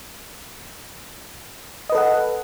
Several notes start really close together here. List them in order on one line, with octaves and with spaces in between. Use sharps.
D#5 B4 A4 F#5